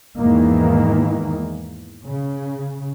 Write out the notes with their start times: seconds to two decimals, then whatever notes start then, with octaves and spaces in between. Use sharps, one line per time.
0.19 E2 G#2 D#3 E3 A#3
2.06 C#3